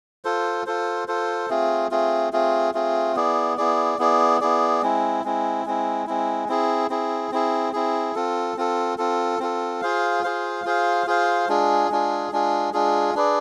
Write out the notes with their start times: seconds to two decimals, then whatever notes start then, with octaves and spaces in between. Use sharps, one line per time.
0.25 F4 A4 C5
0.66 F4 A4 C5
1.08 F4 A4 C5
1.49 A3 C4 F4 G#4
1.91 A3 C4 F4 G#4
2.33 A3 C4 F4 G#4
2.74 A3 C4 F4 G#4
3.15 B3 E4 G#4 D5
3.57 B3 E4 G#4 D5
3.98 B3 E4 G#4 D5
4.41 B3 E4 G#4 D5
4.82 G#3 C4 E4
5.24 G#3 C4 E4
5.66 G#3 C4 E4
6.07 G#3 C4 E4
6.48 C4 E4 G#4
6.90 C4 E4 G#4
7.32 C4 E4 G#4
7.73 C4 E4 G#4
8.15 C4 F4 A4
8.57 C4 F4 A4
8.98 C4 F4 A4
9.39 C4 F4 A4
9.81 F4 G#4 C5 F5
10.23 F4 G#4 C5 F5
10.65 F4 G#4 C5 F5
11.07 F4 G#4 C5 F5
11.49 G#3 D4 F4 G#4
11.89 G#3 D4 F4 G#4
12.32 G#3 D4 F4 G#4
12.73 G#3 D4 F4 G#4
13.14 D4 G#4 B4 D5